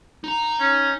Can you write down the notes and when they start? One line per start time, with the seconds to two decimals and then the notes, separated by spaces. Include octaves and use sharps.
0.24 D#4 A#5
0.60 C#4